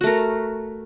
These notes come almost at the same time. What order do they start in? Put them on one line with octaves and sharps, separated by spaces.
F#4 A3 A#4